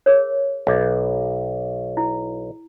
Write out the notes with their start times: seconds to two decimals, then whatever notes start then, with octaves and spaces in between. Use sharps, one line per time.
0.06 G#4 A#4 C#5
0.67 B1 B4 E5 D6
1.97 E4